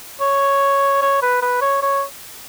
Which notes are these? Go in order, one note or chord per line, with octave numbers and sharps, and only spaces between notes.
C#5
C#5
B4
B4
C#5
C#5